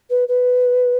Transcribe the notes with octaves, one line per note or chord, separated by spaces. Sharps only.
B4
B4